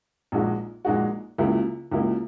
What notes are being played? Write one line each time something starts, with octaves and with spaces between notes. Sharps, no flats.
A#1 A#2 G#3 D#4 F#4
A#1 A#2 G#3 D#4 F#4
C#2 C#3 F#3 A#3 E4
C#2 C#3 F#3 A#3 E4